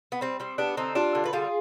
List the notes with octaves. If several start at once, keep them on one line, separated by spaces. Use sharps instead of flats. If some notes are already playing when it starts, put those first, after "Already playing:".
B3
G3 C4
G3 C4
G3 B3 D4
D3 C4 D#4
G3 D4 F4
D3
B4
G3 F4 G#4